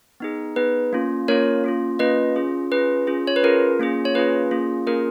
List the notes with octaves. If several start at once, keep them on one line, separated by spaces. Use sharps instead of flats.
B3 D#4 G#4
B3 D#4 G#4 B4
A#3 C#4 F4
A#3 C#4 F4 A#4 C#5
A#3 C#4 F4
A#3 C#4 F4 B4 D#5
C#4 F4 G#4
C#4 F4 G#4 B4
C#4 F4 G#4
C#5
B4
C#4 F4 G#4 A#4
A#3 C#4 F4 G#4
C#5
A#3 C#4 F4 G#4 B4
A#3 C#4 F4 G#4
A#3 C#4 F4 G#4 A#4